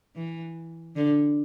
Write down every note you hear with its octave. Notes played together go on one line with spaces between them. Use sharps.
E3
D3